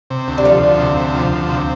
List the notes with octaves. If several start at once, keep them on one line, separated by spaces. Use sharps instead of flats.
C3
D2
G3
F3 A3
D2
C3
D2
F3
D2
C3